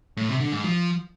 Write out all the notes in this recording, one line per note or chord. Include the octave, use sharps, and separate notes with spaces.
A2
C3
D3
G#2
F3